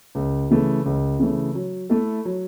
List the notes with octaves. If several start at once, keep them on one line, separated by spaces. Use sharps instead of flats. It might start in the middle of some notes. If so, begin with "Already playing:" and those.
C#2
C#3 E3 A3
C#2
C#3 E3 A3
F#3
A3 E4 A4
F#3